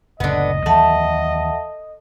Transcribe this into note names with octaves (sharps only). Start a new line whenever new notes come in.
F#1 D2 A#2 D3 B3 D#5
D#2 E3 F#3 A3 E5 F#5 A5